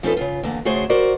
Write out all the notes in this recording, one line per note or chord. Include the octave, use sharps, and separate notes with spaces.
F3 C#4 D#4 G4 A4 B4
C#3 F4
E2 D3 A#3
C#3 A3 F#4 G#4 C5 D5
F#4 A#4 C5 D5